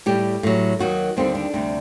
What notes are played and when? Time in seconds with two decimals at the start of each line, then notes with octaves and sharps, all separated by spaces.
0.06 A2 G3 G4
0.43 A2 F#3
0.79 D#2 D#3 F#3 F#4
1.17 D#2 D3 G3 C4
1.35 D4
1.53 D2 C3 G3